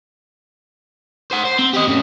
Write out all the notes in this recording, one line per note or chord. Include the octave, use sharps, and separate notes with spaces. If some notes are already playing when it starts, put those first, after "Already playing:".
C5 F#5
C5
C4
G4 D#5
A2 C#3